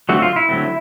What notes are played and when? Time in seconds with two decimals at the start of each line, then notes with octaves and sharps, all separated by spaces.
0.09 D3 F#3 A3 C4 F#4
0.22 F4
0.36 E4
0.49 D3 F#3 A3 C4